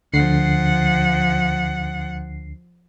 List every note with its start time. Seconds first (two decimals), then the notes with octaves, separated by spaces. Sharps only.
0.14 D2 D3 F3 F#5 C7